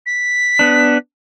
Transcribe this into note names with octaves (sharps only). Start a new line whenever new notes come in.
B6
B3 D4